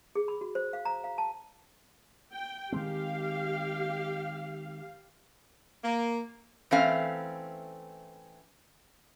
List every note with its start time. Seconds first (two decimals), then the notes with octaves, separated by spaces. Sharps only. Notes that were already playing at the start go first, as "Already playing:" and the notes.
0.15 G#4
0.28 B5
0.41 F#4
0.55 C5
0.73 F5
0.85 A#5
1.04 F5
1.18 A5
2.33 G5
2.72 D#3 G#3 C4 G4 F5
5.84 A#3
6.71 E3 A3 C4 C#4 F5